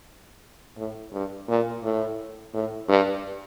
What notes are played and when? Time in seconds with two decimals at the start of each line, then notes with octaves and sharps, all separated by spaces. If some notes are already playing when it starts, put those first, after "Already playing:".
0.78 A2
1.13 G2
1.48 A#2
1.83 A2
2.54 A2
2.89 G2